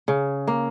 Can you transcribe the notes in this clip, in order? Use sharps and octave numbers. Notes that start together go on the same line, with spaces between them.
C#3
A#3